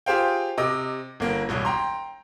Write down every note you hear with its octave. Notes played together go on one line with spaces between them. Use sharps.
F4 G4 G#4 C5 F5 G5
C3 D#5 D6
G1 A#3
E1 C2 C#5
G5 A#5 C6